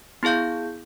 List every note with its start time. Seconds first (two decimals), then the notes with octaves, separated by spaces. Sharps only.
0.23 B3 E4 G#4 F5 G6